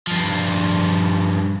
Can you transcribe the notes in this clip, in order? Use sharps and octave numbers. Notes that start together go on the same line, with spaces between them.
G2 F3